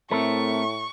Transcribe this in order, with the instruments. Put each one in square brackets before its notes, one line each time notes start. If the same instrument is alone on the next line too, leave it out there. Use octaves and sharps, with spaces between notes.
[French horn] A2 [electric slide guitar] A3 [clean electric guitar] C4 A4 A#4 [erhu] C#6